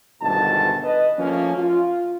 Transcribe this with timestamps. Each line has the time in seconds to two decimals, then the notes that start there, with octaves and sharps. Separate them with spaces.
0.22 G1 D2 G#2 B2 D#3 A5
0.84 B4 D#5
1.18 F3 A3 A#3 C#4
1.58 F4